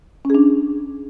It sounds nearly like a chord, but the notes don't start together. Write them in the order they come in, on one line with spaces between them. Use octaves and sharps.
C#4 G#4 D4